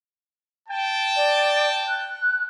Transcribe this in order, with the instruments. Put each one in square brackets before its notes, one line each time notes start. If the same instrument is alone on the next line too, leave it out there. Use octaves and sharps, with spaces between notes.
[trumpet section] G5 A5
[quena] D5
F#6